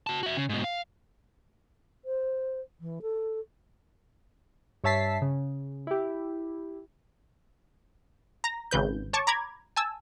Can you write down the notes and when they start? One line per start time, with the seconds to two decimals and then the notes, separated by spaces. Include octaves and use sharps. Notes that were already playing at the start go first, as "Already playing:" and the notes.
0.07 F#4 A5
0.23 F#4 E5
0.37 C#3
0.49 G#2 B2
0.64 F5
2.05 C5
2.81 E3
3.02 A4
4.84 G2 C#5 E5 A5 B6 C7
5.22 C#3
5.87 E4 G4
8.44 A#5 A#6
8.71 G#1 C#3 B4 G6
9.13 C#5 A5 C#6 D6
9.27 A#5 B5 D6 G#6
9.76 G#5 A5 E6